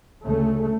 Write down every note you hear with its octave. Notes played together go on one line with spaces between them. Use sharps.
D2 C#3 A3